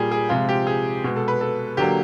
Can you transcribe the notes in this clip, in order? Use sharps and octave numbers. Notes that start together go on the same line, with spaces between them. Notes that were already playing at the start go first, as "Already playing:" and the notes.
Already playing: A#2 G3 A#3 G4 G#4
G#4
C3 F3 G#3 F4
G4
G#4
B2 G#3
A4
B4
A4
D3 F#3 A#3 G4